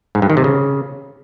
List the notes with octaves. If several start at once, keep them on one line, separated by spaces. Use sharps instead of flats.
G#2
G2
D#3
C3
C#3